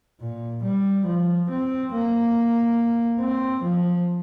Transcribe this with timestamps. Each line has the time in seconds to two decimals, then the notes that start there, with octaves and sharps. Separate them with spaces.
0.20 A#2
0.63 G3
1.05 F3
1.49 C4
1.92 A#3
3.20 C4
3.63 F3